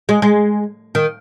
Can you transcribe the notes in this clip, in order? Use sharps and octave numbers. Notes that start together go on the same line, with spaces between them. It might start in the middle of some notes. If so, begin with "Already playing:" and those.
G#3
G#3
D#3